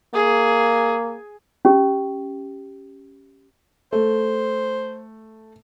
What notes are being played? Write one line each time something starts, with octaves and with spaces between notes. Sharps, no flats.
A#3 G#4
C#4 G4
A3 C5